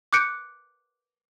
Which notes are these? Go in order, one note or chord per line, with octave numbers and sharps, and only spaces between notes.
D6 F#6 G6 C#7 D7